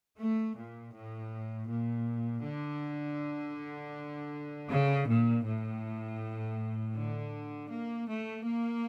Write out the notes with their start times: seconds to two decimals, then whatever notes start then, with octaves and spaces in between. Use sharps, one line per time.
0.19 A3
0.57 A#2
0.95 A2
1.70 A#2
2.45 D3
4.70 C#3
5.08 A#2
5.45 A2
6.95 D3
7.70 A#3
8.08 A3
8.46 A#3